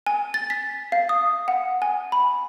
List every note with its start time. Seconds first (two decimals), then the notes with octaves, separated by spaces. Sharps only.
0.07 G#5
0.34 A6
0.50 B6
0.92 F5
1.09 D#6
1.48 F#5
1.82 G#5
2.12 B5